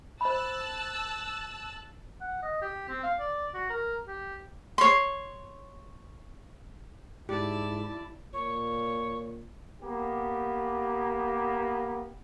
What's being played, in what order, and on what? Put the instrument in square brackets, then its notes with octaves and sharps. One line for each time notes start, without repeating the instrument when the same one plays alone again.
[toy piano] C5 B5 [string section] A5 E6 F#6
[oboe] F#5
D#5
G4
C4
F5
D5
F#4
A#4
G4
[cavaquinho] C#5 C6
[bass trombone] G#2 [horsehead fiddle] E4 [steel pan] G4 [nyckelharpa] D5 A5
[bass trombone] A#2 [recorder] C#5
[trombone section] A#3 B3 G4